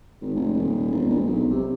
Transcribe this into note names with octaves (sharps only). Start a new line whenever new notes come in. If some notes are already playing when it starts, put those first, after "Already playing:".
G#1
F1
D#1
E1
A#1
B1
C3